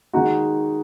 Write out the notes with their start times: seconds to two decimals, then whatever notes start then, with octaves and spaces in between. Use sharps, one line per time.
0.13 D#3 G#3 D#4 F#4